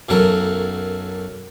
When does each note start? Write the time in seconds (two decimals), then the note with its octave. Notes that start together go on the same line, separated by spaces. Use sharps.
0.09 B1 F#2 F#3 A4 A#4